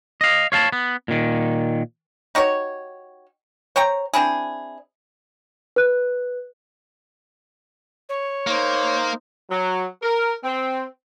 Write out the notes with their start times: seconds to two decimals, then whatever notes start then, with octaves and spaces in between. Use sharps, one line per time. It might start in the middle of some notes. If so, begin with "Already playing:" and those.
0.21 D#5 F5
0.52 C#5 F5 G#5 A5
0.72 B3
1.08 A#2 D#3
2.35 D#4 F#4 G4 C#5
3.76 C5 C#5 G5 A#5
4.13 C4 D4 E4 G#4
5.76 B4 F#6
8.09 C#5
8.47 A#3 D#4 C5
9.50 F#3
10.02 A#4
10.44 C4